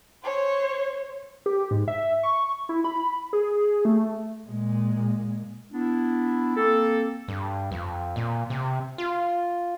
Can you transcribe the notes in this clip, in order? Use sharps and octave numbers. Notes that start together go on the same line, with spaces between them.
C5 C#5
G4
G#2
E5
C#6
E4
B5
G#4
A3
A#2 G#3
B3 D4 E4
A#3 C4 A4
G2
F2
A#2
C3
F4